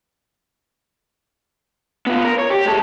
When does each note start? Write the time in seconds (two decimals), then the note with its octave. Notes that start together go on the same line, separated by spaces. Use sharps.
2.07 B3 F4
2.24 A#4
2.38 C#5
2.50 G4
2.66 G#3 A4